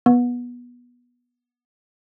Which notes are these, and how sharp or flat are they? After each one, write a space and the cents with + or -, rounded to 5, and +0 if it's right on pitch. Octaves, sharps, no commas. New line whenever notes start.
B3 -15